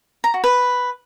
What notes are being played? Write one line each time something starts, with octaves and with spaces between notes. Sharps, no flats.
A#5
F#4
B4